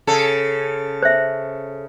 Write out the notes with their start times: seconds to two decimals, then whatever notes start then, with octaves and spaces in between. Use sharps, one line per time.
0.07 C#3 A4
1.02 C5 E5